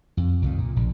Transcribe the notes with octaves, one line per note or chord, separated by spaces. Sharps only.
F2
C2 F2 D#3
A#2
A#1